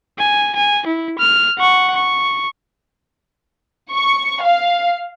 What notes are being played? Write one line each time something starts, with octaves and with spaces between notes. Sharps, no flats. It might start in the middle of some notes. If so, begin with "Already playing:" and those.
G#5
G#5
E4
F6
F#5 C#6
C#6
C#6
F5